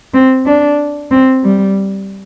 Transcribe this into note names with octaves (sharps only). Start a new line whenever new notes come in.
C4
D4
C4
G3